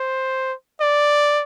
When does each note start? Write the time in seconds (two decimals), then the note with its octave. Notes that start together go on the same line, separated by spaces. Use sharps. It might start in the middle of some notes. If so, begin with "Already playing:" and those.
Already playing: C5
0.81 D5